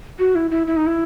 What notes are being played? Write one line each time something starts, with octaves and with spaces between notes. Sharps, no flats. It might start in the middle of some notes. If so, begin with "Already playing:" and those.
F#4
E4
E4
E4
D#4
E4